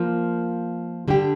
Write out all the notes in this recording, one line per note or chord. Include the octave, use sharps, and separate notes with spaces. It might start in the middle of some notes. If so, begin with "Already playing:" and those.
Already playing: F3 A#3 F4 A#4
D3 G3 D4 G4